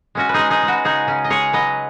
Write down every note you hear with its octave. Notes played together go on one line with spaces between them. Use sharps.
G#3 C#4 F#4
B4
G#3 D#4 G#4
D#4 G#4
G#3
F#4 B4
C#3 D#4 G#4
C#3 C#4
D#5
G#3 G#4 C#5
F#3 B4 D#5